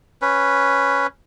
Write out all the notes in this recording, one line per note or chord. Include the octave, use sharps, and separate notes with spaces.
C#4 B4